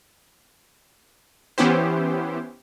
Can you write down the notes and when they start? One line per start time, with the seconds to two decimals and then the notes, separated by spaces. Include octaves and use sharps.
1.58 E3 B3 C#4 E4 G4 C5